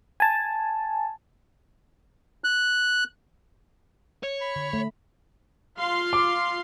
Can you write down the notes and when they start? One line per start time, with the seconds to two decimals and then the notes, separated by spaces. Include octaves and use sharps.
0.20 G#5 A5
2.44 F#6
4.23 C#5
4.41 B5
4.56 D3
4.73 A3
5.78 F4 F5 C6
6.13 D6